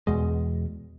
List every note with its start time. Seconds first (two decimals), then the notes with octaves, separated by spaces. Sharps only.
0.07 E2 B2 G#3